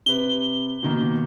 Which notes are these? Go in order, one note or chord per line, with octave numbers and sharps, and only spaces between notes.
C3 B4 G7
B2 D#3 A#3